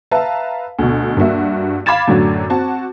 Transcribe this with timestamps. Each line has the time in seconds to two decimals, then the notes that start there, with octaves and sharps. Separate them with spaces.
0.11 B4 E5 F5 A5 A#5
0.79 D2 B2
1.17 G2 A#3 F#4 E5
1.86 F5 B5 D6 G#6 A6 E7
2.08 F#2 A2 D3 F#3
2.50 C4 F#4 A5